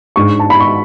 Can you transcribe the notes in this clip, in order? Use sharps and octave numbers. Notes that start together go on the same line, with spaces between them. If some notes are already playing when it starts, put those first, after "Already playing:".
G#2 G#3 D4 C#6
A5
B5
C#6